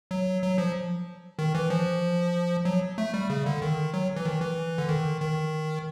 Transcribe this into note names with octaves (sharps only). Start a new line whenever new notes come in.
F#3
F#3
F3
D#3
E3
F3
F#3
A3
G3
C#3
D3
D#3
F#3
E3
D#3
E3
D3
D#3
D#3